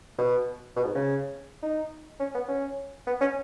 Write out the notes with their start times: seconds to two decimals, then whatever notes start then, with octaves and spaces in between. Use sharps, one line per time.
0.18 B2
0.76 B2
0.85 G#2
0.95 C#3
1.62 D#4
2.20 C#4
2.34 B3
2.48 C#4
3.06 B3
3.21 C#4